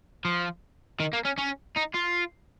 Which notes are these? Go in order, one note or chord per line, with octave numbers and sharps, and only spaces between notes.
F3
D#3
A#3
C#4
C#4
D#4
F4